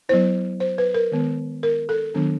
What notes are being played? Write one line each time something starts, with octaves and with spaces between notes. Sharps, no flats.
F#3 B3 E4 C5
C5
B4
A#4
D#3 G#3 B3
A#4
A4
D#3 F#3 B3 D4